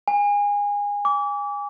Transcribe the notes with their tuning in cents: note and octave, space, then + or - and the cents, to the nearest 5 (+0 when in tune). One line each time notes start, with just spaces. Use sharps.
G#5 -25
D6 -30